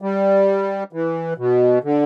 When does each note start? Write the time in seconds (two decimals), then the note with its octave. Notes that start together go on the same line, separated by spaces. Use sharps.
0.02 G3
0.93 E3
1.38 B2
1.84 D3